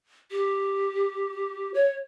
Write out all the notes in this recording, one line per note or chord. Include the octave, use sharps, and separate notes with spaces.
G4
C#5